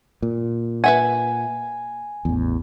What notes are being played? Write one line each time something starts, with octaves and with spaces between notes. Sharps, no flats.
A#2
B4 E5 F#5 G#5
A1 E2